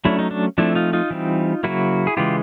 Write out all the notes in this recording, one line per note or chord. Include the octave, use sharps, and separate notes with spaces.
F#3 A3 C#4 D4 E4
D#4
D4
F3 A3 C4 D4 E4
D#4 F4
D#4 F4
E3 G3 C4
C#3 F#3 A#3 E4 F#4
G#4
C#3 E3 G#3 F4 G4